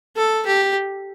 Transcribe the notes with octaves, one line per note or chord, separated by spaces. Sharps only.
A4
G4